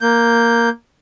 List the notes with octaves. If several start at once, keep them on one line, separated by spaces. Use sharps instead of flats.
A#3 G6